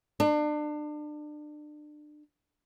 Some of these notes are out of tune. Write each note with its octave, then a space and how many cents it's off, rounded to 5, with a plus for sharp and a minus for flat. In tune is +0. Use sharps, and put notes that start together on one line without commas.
D4 +30